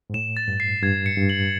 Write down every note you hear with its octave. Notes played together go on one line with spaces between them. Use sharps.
G#2
A2 E7
A6
G2
C7
G2 G#6
C#7
G2
F#7